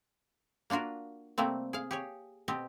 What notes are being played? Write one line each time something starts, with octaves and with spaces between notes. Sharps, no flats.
A#3 D4 F4 F#4 A#4
C3 G3 A3 A#3 C4
G#4 F5
G4 G#4 C#5
B2 C4 G4 D#5